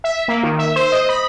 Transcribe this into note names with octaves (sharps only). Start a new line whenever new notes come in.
E5
A#3
D#3
E5
C5
D#5
B5